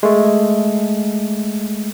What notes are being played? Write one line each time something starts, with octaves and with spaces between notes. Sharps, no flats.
G#3 A3